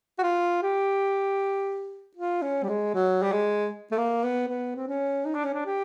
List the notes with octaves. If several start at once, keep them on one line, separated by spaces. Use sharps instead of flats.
F#4
F4
G4
F4
C#4
G3
G#3
F#3
G3
G#3
A3
A#3
B3
B3
C4
C#4
D#4
D4
C#4
D4
G4